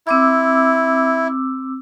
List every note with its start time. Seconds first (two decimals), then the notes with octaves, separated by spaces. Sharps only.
0.07 C4 E4 D6 E6